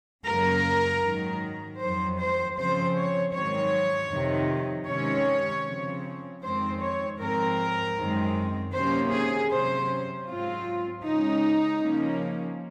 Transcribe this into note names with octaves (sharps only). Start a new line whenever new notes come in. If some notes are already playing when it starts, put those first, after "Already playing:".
F#2 C#3 F#3 A#3 A#4
G#2 D#3 F#3
F2 D#3 F#3 C5
C5
C#3 F3 C4 C5
C#5
G#2 D#3 F#3 C4 C#5
F2 C3 D#3
C3 D#3 G#3 C#4 C#5
C#3 F3 C4
F2 D#3 G#3 C4 C5
C#5
G#2 F3 C4 A#4
F#2 D#3 G#3 C4
C3 D#3 F#3 A#3 C#4 C5
G#4
C3 F#3 C#4 C5
G#2 F#3 C4 F4
C#3 G#3 C#4 D#4
C#3 F3 A#3 C#4